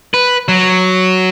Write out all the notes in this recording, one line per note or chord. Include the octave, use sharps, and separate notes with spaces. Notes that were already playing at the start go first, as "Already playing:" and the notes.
B4
F#3